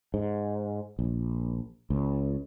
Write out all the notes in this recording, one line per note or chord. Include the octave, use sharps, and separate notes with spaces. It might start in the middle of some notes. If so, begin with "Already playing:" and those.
G#2
A#1
C#2